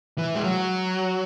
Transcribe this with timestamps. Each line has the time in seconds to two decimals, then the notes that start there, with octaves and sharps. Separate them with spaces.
0.18 E3
0.35 G#3
0.44 F#3